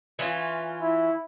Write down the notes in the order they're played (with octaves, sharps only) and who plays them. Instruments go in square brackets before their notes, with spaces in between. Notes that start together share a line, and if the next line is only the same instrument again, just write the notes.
[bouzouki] E3 C#4 F4
[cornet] E4